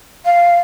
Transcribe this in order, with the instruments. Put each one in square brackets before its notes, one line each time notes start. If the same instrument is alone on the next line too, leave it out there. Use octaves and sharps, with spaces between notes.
[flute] F5